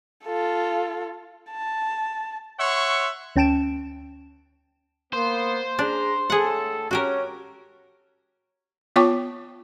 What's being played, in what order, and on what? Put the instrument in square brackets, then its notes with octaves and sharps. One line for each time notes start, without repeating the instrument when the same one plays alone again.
[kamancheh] F4 A4
A5
[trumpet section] C#5 E5 F#5 C6 C#6
[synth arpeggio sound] D2 C#4 G5 A5 D7 E7
[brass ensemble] A#3 B3 [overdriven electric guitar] C5
[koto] D4 [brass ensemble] G#4 A#5
[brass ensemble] A2 A4 [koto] G#4 F#5
[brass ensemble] C#4 [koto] F#4 G4 A#4
[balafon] B3 F4 C#5 G5 C#6 D6